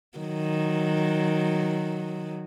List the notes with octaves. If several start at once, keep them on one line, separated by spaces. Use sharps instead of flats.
D#3 F#3